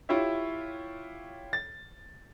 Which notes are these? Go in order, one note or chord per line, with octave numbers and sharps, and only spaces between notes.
E4 F4 G4 C#5 E5
A6